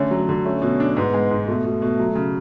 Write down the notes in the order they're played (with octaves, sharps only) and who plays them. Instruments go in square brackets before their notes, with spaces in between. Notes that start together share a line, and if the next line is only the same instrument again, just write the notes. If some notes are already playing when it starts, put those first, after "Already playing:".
Already playing: [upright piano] D3 A3 [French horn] C#4
[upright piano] F#3
D3
[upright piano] A3 [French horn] C#4
[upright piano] B2
D4
[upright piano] G#2 [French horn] B3
[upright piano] G#3
G#2
[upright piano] B2 [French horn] A3
[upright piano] B2
B2
F#3
C#3